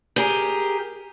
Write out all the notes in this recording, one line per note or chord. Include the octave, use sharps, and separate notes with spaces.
G4 G#4 A#4